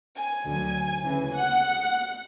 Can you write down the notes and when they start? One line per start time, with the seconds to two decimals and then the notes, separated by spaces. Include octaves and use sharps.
0.16 G#5
0.44 D2 D3 F#3
1.03 D2 C#3 E3
1.32 F#5